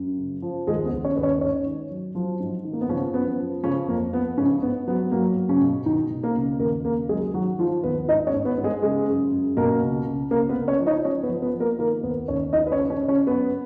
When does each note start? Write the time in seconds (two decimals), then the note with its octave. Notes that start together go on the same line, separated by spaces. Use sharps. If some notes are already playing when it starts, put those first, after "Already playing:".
Already playing: F#2
0.18 C#3
0.42 F3
0.67 D#2 G#3 G#4
0.85 B3 B4
0.92 D#2
1.04 C#4 C#5
1.17 D#2 B4
1.23 C#4 C#5
1.41 G#2 C#4 C#5
1.66 D#3
1.91 F#3
2.15 F3 F#3 F4
2.40 G#2
2.65 D#3
2.73 A#3
2.81 B3
2.89 C#3 F3 C#4
3.14 F#2 B3
3.38 F3
3.63 C#3 F3 C#4
3.89 F2 A#3
4.13 F3 B3
4.37 G#2 C#3 C#4
4.62 G#2 B3
4.87 F#3 B3
5.11 F#3 A#3
5.37 F#3
5.49 C#3 C#4
5.62 B2
5.86 B2 D#3 D#4
6.11 B2
6.23 A#3 A#4
6.35 C#2
6.60 D#2 A#3 A#4
6.85 C#3 A#3 A#4
7.09 F#3 G#3 G#4
7.34 D#3 F#3 F#4
7.59 D#3 F3 F4
7.83 D#2 B3 B4
8.08 G#2 D#4 D#5
8.27 C#4 C#5
8.34 G#2
8.45 B3 B4
8.58 G#2
8.64 G#3 G#4
8.82 C#3 G#3 G#4
9.07 F#2
9.32 F#2
9.57 B2 A#3 A#4
9.82 C#2
10.06 C#2
10.31 C#2 A#3 A#4
10.49 B3 B4
10.55 C#2
10.68 C#4 C#5
10.80 F3
10.87 D#4 D#5
11.05 F3 C#4 C#5
11.23 B3 B4
11.29 F3
11.42 B3 B4
11.54 F3
11.60 A#3 A#4
11.79 D#3 A#3 A#4
12.03 D#2 B3 B4
12.28 D#2 C#4 C#5
12.53 F3 D#4 D#5
12.67 B4
12.72 C#4 C#5
12.77 C#3
12.90 C#4 C#5
13.03 C#3
13.08 C#4 C#5
13.27 F#2 B3 B4